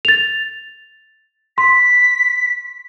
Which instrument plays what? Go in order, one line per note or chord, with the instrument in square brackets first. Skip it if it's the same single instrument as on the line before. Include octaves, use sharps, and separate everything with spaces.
[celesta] A6 F7
[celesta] C6 [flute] B6